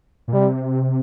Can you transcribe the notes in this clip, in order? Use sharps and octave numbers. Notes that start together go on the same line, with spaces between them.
A#2
C3 G3